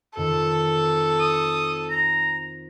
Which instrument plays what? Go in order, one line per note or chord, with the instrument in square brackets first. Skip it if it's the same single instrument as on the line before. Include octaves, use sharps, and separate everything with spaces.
[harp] F2 D#3 [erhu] A4
[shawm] D#6
A#5